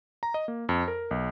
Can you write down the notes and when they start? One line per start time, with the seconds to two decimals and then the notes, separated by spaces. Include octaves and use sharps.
0.23 A#5
0.34 D#5
0.48 A#3
0.69 F2
0.88 A#4
1.11 B1